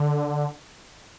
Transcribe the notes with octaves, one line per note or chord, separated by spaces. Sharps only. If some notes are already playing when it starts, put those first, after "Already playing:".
Already playing: D3